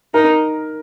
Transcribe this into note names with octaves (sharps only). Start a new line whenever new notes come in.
D#4 A#4